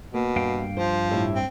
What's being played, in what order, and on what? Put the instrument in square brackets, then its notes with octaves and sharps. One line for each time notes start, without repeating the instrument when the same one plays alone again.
[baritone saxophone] B2 [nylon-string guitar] A#3
[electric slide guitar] G2 F5 G5
[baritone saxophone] F3 [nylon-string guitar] C5
[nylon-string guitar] A2 G4 E5
[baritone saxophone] C4